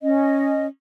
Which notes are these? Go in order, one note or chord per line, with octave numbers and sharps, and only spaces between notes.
C#4 D#5